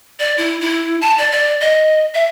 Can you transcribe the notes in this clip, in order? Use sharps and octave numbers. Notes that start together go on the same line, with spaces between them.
D5
E4
E4
A5
D5
D5
D#5
E5